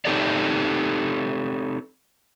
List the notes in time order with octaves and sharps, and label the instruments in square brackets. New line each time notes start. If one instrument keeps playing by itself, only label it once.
[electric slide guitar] C4 D#4 G4 A4 C#5 D5